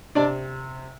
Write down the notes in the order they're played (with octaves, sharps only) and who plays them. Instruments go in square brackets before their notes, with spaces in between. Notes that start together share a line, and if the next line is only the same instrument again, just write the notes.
[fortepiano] C3 D4 D5